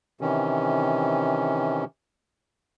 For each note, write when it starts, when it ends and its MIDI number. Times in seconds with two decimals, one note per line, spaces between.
0.21 1.84 48
0.21 1.84 51
0.21 1.84 52
0.21 1.84 61